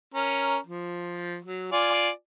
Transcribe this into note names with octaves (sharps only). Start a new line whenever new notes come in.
C#4 A#4 A#5
F3
F#3
F4 D5 G#5